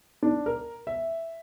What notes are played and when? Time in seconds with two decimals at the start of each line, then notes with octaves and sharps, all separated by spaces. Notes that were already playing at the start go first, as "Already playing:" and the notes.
0.23 D4
0.46 A#4
0.87 E5